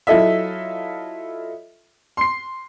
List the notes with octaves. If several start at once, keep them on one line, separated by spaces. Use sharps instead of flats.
F#3 E4 F4 A4 D#5 E5
C6 C7